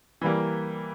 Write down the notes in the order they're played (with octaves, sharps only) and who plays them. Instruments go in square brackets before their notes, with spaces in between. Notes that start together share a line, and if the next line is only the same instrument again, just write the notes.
[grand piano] E3 G3 A#3